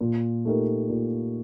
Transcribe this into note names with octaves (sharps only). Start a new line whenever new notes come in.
A#2
A3 D#4 G4 A#4
A#2